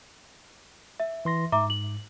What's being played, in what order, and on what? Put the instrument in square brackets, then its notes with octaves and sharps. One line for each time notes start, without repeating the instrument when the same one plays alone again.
[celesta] E5
[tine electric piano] E3 C6 A#6
[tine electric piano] G#2 [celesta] E5 A#5 D6
[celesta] F#7